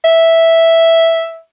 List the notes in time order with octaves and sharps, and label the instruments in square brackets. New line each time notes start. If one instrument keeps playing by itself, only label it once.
[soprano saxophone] E5